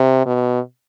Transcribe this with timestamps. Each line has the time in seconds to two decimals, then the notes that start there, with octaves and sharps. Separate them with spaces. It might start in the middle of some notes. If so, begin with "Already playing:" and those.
Already playing: C3
0.26 B2